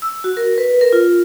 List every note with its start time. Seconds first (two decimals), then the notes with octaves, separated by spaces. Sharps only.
0.02 E6
0.24 F#4
0.37 A#4
0.58 B4
0.81 A#4
0.93 F4